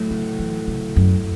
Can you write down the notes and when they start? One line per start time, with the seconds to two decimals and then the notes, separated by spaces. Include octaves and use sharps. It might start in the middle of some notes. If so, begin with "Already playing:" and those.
Already playing: A2 F#3 A3 F#4
0.11 C#3
0.39 E3
0.67 C#3
0.96 F#2